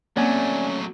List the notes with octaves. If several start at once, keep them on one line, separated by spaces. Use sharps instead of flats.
F#3 A3 A#3 C4 C#4 D5 G#5